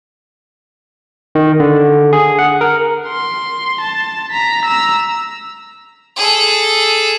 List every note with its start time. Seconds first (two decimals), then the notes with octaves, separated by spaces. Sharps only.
1.35 D#3
1.60 D3
2.13 G#4
2.39 F#5
2.61 A#4
3.08 C6
3.81 A5
4.31 A#5 B6
4.65 A#5 E6
6.17 G#4 A4